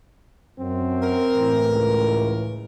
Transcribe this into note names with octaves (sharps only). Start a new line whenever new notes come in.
F#2 C4
A#4
A2 E3
C#2